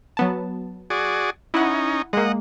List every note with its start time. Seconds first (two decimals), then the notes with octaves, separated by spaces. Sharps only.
0.17 F#3 B3 A5
0.90 F#4 G#4 D5
1.54 C#4 D#4 E4 F#5
2.13 G#3 A#3 D#5 F#5